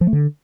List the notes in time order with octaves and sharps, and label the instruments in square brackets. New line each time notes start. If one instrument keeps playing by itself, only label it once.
[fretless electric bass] F3
A3
D3